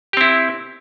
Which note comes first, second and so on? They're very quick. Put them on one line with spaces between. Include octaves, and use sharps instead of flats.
G4 C4 E4